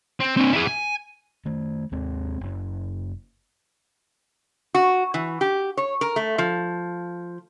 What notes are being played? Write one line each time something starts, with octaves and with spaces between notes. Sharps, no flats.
C4
C4 D4
E4 G#4
G#5
D#3 A3
D#2 G#3 C4
F#1
F#4
E3
G4
C#5
A#4
A3
F3